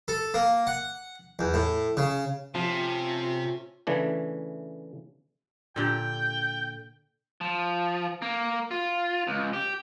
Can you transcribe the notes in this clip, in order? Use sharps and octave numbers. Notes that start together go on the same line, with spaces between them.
A4
A#3
F#5
E2
A2
C#3
C3 F3 A3 C4 C#4 F4
C#3 E3 A3 D4
A#2 D3 G4 G5
F3
A#3
F4
C#2
G4